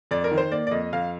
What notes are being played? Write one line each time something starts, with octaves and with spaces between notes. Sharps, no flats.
F2 D5
A#4
D#3
C5
A#3 D5
D5
F2 D#5
F2 F5